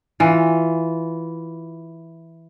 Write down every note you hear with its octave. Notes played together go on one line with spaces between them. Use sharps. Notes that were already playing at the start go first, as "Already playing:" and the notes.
E3 F4